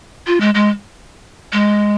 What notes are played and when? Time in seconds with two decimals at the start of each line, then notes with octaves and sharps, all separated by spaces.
0.27 F4
0.40 G#3
0.54 G#3
1.53 G#3